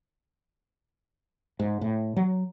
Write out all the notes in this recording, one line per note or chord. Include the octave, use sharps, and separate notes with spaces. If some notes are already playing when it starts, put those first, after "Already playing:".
G#2
A2
F#3